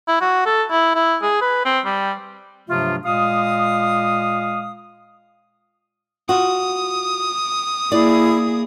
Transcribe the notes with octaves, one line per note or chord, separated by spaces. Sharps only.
E4
F#4
A4
E4
E4
G#4
B4
C4
G3
G2 C3 F3 F#3 A3 F4
A#2 G#3 F5 D#6
F4 F#4 D#6
A#3 E4 G#4 D5